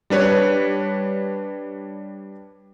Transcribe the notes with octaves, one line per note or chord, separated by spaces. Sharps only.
G3 D4 B4 C#5